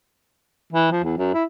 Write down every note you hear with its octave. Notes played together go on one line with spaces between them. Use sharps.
E3
F3
E2
F#2
E4